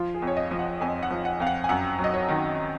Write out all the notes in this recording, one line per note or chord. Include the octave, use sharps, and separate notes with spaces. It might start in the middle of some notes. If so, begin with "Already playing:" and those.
Already playing: F3 F4
G#4
F2
C#5
D#5
F3
F#5
F2 G#5
F#5
F3
F#5
F2 F5
F#5
G#5
F#2 F#5
F#3
D#5
C#5
D#3